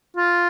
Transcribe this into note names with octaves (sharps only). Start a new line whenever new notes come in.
F4